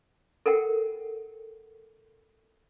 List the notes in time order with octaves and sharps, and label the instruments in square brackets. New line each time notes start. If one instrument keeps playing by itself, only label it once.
[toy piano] A4 A#4 F#5 G5